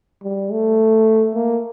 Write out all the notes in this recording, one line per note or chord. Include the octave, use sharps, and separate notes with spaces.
G3
A3
A#3